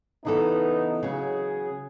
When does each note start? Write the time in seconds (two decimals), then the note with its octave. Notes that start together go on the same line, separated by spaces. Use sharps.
0.25 C#3 E3 B3 D#4 A4
1.03 C#3 F#3 G#4